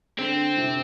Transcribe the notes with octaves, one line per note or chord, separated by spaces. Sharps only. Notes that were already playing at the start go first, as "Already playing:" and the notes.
D3 C4
C3